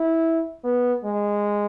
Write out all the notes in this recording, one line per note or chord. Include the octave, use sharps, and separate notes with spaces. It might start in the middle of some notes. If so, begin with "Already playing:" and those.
Already playing: E4
B3
G#3